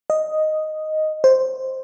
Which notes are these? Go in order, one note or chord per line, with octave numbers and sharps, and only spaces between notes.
D#5
C5